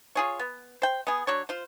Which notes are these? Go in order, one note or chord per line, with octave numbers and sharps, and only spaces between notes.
F4 G#4 C#5
B3
C5 G5
B3 G#4
F#3 D4 C#5
F4 C5